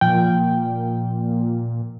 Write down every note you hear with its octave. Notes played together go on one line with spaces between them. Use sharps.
A#2 F3 G5